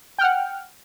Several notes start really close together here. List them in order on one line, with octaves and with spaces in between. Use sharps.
G5 F6 F#5